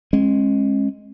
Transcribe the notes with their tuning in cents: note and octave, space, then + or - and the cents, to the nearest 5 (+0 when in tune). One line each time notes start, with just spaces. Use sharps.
G#3 +0 C#4 -40